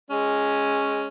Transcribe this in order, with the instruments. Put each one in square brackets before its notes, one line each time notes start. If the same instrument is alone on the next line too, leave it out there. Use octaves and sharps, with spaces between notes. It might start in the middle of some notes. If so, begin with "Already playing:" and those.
[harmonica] G#3 C#4